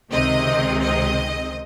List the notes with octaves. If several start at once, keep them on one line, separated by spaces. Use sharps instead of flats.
C#2 C3 D#3 G#3 C4 D#5
D#5